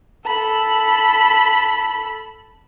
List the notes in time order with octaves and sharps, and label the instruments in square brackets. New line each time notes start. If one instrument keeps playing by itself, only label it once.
[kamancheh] A4 B5